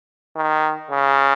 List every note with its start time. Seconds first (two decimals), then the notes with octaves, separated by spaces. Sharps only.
0.36 D#3
0.91 C#3